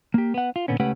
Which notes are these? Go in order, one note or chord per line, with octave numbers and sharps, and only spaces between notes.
A#3 G4
B3 F#5
F4
A#2 D3 B3 C#4
C#2 A3 C#4 G4 B4 F#5